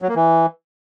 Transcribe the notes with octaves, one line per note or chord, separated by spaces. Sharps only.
F#3
A#3
E3